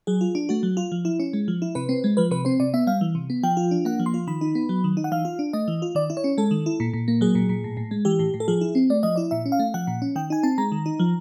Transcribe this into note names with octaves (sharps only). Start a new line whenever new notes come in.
F#3 G#4
F4
D4
A3 F#4
F#3
F4
F3
E4
C#4
G#3
F3
E4
C3 B4
C4
G#3
F3 B4
C3 B4
C4 C5
C3 D5
B3 E5
G3 F5
E3
C3
B3
F3 G5
F4
D4
A#3 F#5
F3
C6
F4
D#3 B5
D#4
B3
F#3
D#3
D#4
F#5
E3 F5
F4
D4
A3 D#5
E3
F4
D#3 D5
E4
C#5
C#4
G#3 A4
D#3
E4
A#2
A#2
A#3
F#3 G#4
A#2
A#2
A2
A2
G#3
E3 G4
A2
A2
A4
F3 G#4
E4
C4
A3 D5
F3 D#5
E4 D5
A#2 E5
C#4
F5
A3
F3 F#5
A#2
C#4
D#3 G5
D#4 G#5
C4 A5
G#3 A#5
D#3
D#4
F3